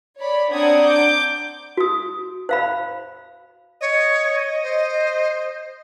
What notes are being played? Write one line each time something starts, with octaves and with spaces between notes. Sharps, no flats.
C#5 D5 B5
C4 D4 F#5 A#5 D#6 G#6
D6 G6
F#4 D#6
C5 F5 B5
C#5 D#5
C5